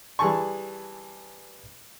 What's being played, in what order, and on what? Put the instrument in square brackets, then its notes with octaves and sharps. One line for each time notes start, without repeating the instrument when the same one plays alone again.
[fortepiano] E3 G3 G#4 G#5 A5 C#6